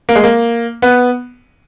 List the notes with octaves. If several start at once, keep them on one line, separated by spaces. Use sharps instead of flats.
A#3
G#3
A#3
B3